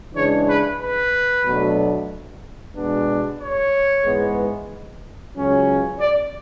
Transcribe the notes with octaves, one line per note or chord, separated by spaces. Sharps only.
C#3 E3 G#3 D4 C#5
B4
B4
B2 F#3 A3 D4
B2 G#3 B3 D4
C#5
G#2 E3 G#3 B3
C#2 C#3 F#3 C#4
D5